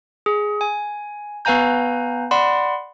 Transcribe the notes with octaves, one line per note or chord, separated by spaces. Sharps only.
G#4
G#5
B3 B4 F5 G#5 A#5 G6
D5 F#5 B5 C6